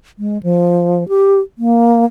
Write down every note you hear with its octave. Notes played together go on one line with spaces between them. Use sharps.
G#3
F3
G4
A#3